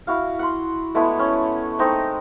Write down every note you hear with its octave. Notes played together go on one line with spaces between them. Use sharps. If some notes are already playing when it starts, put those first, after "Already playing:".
E4 F#4 F5
F#5 C6
G#3 A3 B3 E4
C#4
G#3 A3 C4 D#4